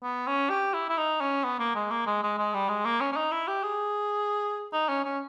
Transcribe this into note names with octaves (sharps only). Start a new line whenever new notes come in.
B3
C#4
G4
E4
E4
D#4
C#4
B3
A#3
G#3
A#3
G#3
G#3
G#3
G3
G#3
A#3
C#4
C#4
D#4
E4
G4
G#4
D#4
C#4
C#4